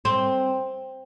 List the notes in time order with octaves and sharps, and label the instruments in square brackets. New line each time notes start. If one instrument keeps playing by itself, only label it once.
[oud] C4